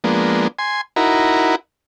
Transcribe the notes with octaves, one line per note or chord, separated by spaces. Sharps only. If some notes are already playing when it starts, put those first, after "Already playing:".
F3 G#3 A#3 B3 D4
G#5 C6
D#4 E4 F#4 A#4 B5